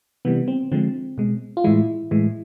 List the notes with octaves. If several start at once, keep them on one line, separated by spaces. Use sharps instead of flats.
C3 E3 G3 B3
C4
D3 F3 G#3 C4
B2 G#3
F4
A2 E3 G#3 E4
A2 E3 G#3